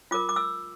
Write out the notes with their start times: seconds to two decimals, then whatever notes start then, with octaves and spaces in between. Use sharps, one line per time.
0.11 F4 A#4 D6
0.29 D6
0.36 E6